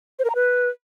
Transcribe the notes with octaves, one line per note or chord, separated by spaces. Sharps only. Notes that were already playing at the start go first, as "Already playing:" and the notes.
C5
A#4
A#5
B4